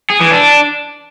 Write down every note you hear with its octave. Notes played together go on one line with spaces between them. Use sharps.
G#4
E3
D4